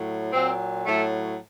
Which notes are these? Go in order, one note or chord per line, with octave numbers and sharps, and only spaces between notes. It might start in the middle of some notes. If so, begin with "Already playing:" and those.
Already playing: A2 F#3
A#2 F#3 C4
A2 F#3 A3